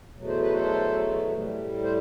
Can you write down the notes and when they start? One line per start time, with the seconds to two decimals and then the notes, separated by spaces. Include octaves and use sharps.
0.13 E2 B2 F#3 A3
0.27 C5
0.40 B4
0.54 A4 C5
1.33 A2 G3
1.83 C5